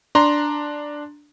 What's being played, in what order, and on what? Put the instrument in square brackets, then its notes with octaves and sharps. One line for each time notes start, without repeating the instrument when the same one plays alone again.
[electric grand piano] D4 A#5 C6